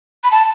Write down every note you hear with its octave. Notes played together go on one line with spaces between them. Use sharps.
B5
A5